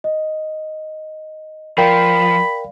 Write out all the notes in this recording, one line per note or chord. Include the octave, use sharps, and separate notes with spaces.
D#5
F3 A#4 D5 F5 G5 B5